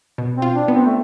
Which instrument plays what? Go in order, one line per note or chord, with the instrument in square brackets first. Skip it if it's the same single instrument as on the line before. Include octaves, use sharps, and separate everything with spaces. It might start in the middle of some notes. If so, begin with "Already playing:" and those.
[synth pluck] B2
[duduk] C4
[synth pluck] F4
[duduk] D4
[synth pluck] B3
[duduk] C4
A3